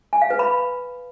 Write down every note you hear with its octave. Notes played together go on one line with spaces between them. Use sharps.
G#5
F5
B4
B5